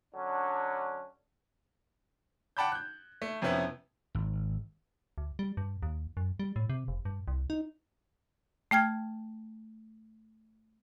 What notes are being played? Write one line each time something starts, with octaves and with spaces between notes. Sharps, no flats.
D3 F#3 C#4 D4
F#5 G5 A5 B5 D6 G6
F#6 G6
A3
F2 C3 F3 B3 C#4 E4
G#1
D2
G3
G2
D#2
F#2
G3
A2
C3
F1
G2
C2
D#4
A3 G5 F6 G#6